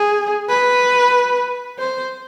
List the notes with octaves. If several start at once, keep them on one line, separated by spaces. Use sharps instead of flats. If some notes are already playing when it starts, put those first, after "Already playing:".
Already playing: G#4
B4
C5